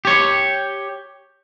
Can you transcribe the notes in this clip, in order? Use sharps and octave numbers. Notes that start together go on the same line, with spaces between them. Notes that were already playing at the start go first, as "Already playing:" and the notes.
G4 C#5